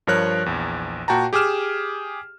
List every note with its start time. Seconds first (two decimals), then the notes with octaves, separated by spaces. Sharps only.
0.07 G2 F3 A#4 C#5 F#6
0.46 A#1 E2
1.08 A#2 F#4 G5 A5 A#5
1.33 G4 G#4 D6 F6 E7